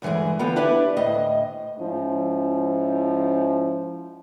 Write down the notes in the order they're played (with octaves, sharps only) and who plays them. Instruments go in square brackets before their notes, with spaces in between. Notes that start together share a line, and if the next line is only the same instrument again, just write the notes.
[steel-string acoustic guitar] D2 G2 E3 G#3 G#4
D3 B3 F4 G4
D4 E4 G4 B4 D5
D2 A2 D#5
[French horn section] G#2 F3 C#4 E4